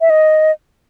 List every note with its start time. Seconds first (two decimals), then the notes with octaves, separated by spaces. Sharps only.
0.01 E5
0.10 D#5